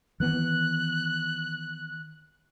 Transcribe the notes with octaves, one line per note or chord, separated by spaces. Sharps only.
D#3 E3 B3 F#6